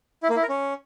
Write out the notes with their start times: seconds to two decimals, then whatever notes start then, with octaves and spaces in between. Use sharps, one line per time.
0.23 E4
0.30 A#3
0.36 E4
0.43 A#4
0.49 C#4